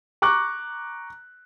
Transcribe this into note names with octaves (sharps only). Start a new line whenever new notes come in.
A#5 C#6 D6 F#6